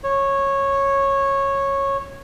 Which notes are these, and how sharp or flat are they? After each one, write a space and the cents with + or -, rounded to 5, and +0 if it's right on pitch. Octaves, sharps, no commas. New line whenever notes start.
C#5 -15